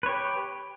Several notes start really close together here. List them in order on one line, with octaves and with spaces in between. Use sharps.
B4 C#5 G4